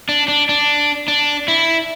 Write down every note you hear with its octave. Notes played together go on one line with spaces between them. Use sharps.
D4
D4
D4
D4
E4